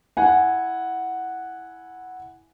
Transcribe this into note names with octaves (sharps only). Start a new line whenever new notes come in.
E4 F#5 G#5